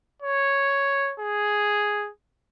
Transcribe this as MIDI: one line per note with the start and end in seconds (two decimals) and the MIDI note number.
0.22 1.14 73
1.20 2.10 68